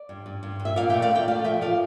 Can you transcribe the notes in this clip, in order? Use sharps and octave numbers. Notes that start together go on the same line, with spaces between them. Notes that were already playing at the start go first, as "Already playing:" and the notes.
Already playing: D5
G2
G2
G2
G2
E5
A#2 D5 F5
A3 E5 G5
D5 F5
A3 E5 G5
A3 D5 F5
F3 E5 G5
F3 D5 F5